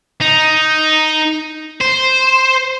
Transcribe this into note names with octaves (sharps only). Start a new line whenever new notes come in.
D#4
C5